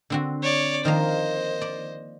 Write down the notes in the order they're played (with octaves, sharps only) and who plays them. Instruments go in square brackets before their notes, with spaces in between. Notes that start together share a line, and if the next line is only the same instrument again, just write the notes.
[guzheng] D3 C4 F#4
[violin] C#5 D5
[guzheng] D#3 F3 A#3 [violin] C5 D#5
[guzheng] D5